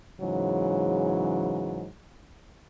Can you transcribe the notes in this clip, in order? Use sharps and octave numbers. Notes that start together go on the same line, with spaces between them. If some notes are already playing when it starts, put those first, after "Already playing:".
G#2 C#3 E3 F#3